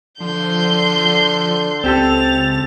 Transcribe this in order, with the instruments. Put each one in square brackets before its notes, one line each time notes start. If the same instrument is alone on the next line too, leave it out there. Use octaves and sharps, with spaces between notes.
[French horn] D3 [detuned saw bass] F3 [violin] C6 G6
[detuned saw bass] C#2 [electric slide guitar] C4 G4 A4 [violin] A6 F7